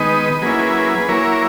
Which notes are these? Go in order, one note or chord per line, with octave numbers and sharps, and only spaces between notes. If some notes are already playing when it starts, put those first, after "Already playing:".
Already playing: D#3 G#3 B3 D#4 B4 D#5
F#3 A#3 C#4 E4 G#4 B4
F#3 A#3 E4 A#4 C#5